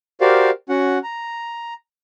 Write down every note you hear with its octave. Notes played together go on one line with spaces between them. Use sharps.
F#4 G4 A#4 C5 D5 F5
C#4 F#4 F#5
A#5